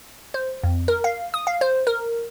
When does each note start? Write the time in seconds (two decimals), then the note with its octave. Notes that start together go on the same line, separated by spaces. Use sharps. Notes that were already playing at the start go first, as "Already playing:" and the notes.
0.34 C5
0.63 F2
0.88 A#4
1.04 F5
1.34 D#6
1.47 F5
1.61 C5
1.87 A#4